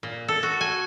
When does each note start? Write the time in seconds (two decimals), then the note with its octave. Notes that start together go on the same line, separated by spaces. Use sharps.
0.03 A#2
0.28 A4
0.43 F#4
0.61 G#5